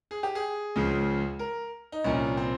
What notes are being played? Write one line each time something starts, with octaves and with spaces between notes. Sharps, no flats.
G#4
G4
G#4
C#2 C#3 F3
A#4
D#4
C2 A#2 F3 C#4
C4